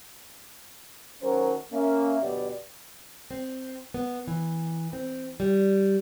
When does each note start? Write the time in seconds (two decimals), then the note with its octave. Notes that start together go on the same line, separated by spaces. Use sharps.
1.22 D#3 F#3 A3 C#4 A#4 C5
1.72 A#3 C#4 E5
2.21 D2 B2 F#3 G4 B4 D5
3.31 C4
3.94 B3
4.28 E3
4.93 C4
5.40 G3